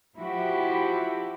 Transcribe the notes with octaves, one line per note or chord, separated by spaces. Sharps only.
F3 E4 F#4 G4